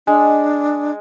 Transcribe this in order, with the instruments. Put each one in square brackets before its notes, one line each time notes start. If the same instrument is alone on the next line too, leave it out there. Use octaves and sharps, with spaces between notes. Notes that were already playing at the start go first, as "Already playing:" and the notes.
[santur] G#3 [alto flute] D4